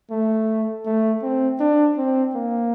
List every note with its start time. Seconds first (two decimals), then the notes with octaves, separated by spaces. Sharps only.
0.11 A3
0.86 A3
1.22 C4
1.60 D4
1.97 C4
2.34 A#3